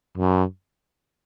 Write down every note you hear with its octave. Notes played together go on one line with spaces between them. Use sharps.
F#2